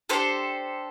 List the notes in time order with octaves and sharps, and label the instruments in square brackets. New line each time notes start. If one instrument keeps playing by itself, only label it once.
[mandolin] D4 G4 A4 C5